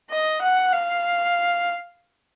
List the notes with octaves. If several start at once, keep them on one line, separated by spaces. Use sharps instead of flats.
D#5
F#5
F5